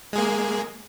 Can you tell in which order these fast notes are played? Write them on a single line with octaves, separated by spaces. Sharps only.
G#3 G#4 A#3